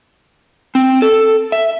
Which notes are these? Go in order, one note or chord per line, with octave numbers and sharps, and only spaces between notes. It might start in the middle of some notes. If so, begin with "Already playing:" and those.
C4
A4
E5